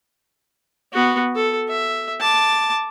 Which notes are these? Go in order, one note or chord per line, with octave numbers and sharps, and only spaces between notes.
B3 F#4
A4
E5
A5 D6